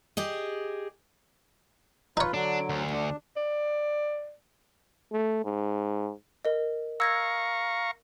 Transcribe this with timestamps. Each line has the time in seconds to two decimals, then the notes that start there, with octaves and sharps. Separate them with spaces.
0.17 G4 G#4 D#5
2.17 D#4 F4 B4 C#5
2.34 D3 F#3 D4
2.69 D2
2.92 D4
3.37 D5
5.12 A3
5.45 G#2
6.45 A#4 D#5
7.00 F5 A#5 C#6 E6 G#6 A#6